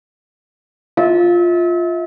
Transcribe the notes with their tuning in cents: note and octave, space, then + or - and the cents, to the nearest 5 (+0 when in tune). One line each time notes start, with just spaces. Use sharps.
F4 +0 E5 -35